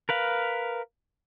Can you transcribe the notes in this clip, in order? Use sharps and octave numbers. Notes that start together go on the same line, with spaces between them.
A#4 B4 F5